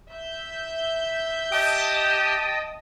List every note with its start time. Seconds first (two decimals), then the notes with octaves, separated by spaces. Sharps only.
0.11 E5 G6
1.52 G4 D#5 G5 A5 D#6